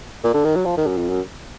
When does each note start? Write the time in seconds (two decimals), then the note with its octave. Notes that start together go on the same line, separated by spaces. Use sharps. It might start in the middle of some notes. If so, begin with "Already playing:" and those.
0.24 A#2
0.34 D3
0.45 D#3
0.55 F#3
0.65 F3
0.77 D#3
0.87 F#2
0.97 F2
1.09 F#2